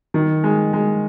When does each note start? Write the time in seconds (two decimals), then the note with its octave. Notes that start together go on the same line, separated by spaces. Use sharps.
0.14 D#3
0.44 G#3
0.73 G#3